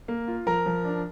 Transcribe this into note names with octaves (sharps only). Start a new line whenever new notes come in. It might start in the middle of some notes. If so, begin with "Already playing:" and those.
A#3
F4
F3 A#4 A#5
F3
D4